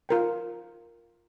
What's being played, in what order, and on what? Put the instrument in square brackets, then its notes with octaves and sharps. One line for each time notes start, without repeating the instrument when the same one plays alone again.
[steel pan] F4 A#4 G5